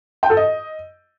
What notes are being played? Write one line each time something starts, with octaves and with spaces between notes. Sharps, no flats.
G5
A4
D#5